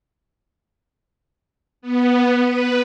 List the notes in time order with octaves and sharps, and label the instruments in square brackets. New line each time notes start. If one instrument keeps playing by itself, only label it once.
[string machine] B3
B4